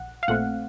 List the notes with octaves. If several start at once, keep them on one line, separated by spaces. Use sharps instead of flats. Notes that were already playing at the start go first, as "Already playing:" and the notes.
Already playing: A#1 F#5
F5
A#1 A#2 A3 C4 F#5